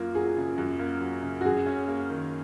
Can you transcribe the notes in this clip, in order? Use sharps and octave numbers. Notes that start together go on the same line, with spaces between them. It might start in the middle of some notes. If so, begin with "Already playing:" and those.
Already playing: F#2 A#3 F4
F#3 G#4
C#3
F#2
A#3
F#3
C#3
F#4
F#2 G#4
C#4
A#3
D#3